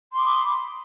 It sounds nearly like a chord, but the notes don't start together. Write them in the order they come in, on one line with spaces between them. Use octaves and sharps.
C6 D6 D#6 B5